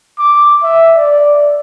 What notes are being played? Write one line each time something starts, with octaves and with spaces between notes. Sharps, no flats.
D6
E5
D5